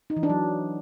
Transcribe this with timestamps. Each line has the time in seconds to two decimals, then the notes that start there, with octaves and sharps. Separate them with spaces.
0.10 D#4
0.16 E3
0.23 D4
0.30 F#3